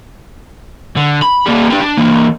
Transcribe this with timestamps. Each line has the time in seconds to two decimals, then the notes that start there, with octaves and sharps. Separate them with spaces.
0.97 D3
1.22 B5
1.46 G3 A#3
1.70 D4 G4
1.81 D4
1.98 E3 A#3